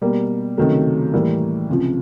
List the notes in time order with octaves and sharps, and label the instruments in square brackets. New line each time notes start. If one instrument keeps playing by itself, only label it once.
[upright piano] B2 G3 A#3
C#2 C3 D#3 F#3 A3
A2 E3 G3 A#3
C#2 C3 F3